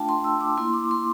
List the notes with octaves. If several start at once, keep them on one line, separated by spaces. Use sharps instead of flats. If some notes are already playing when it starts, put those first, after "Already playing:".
Already playing: A3 D4 F4 F5 G5 A5
C6
E6
D6
A#3 E4 C6
D6
C6